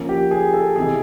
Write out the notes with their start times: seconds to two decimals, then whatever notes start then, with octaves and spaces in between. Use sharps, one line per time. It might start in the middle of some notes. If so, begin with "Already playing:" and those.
Already playing: F3 A#3 C#4
0.09 G4
0.31 G#4
0.54 A4
0.76 C3 E3 G3 B3 D#4 G#4